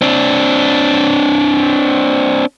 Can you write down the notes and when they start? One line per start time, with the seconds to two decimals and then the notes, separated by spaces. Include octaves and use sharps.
0.02 C4 D4